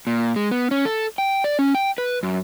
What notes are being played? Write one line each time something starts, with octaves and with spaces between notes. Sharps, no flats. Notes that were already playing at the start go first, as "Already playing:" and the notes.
A#2
G#3
B3
C#4
A4
G5
D5
C#4
G5
B4
F#2